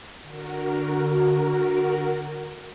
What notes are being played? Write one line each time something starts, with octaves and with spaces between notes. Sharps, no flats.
D3 F#4 A#4